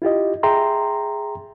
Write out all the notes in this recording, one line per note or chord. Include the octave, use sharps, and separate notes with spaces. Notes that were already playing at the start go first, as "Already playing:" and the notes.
E4 F4 G4 D#5
G#4 E5 G5 A#5 C6